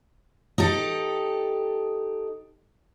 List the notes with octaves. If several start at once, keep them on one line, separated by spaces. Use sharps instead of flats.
D#4 G4 A4